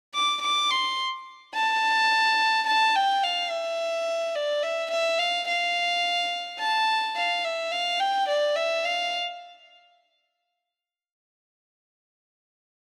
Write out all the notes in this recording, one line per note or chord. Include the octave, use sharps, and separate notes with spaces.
D6
D6
C6
A5
A5
G5
F5
E5
D5
E5
E5
F5
F5
A5
F5
E5
F5
G5
D5
E5
F5